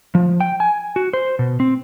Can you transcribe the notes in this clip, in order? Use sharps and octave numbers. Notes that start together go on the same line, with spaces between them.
F3
G5
G#5
F#4
C5
B2
C4